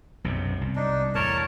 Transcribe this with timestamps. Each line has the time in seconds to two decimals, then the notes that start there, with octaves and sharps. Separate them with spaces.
0.24 B1 F#2 C3
0.61 C2
0.76 D4 D#4
1.15 E2 A2 A#4 C#5 A5